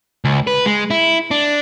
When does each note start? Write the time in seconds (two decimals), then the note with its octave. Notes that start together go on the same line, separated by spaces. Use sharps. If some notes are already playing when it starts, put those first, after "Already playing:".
0.25 C#2
0.47 B4
0.66 G#3
0.91 E4
1.31 D4